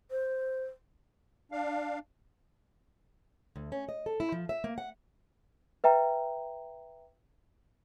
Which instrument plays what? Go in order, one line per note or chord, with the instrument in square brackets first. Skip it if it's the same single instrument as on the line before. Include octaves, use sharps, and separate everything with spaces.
[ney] C5
[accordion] D4 F5
[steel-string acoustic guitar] D2
C#4
D#5
A4
E4
F3
E5
A#3
F#5
[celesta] B4 E5 G5 A#5